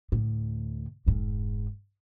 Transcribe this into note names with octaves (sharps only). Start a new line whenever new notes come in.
D2 A2
F1 G#2